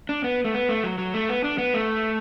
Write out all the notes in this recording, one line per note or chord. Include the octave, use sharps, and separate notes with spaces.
D4
B3
A3
B3
A3
F#3
F#3
A3
B3
D4
B3
A3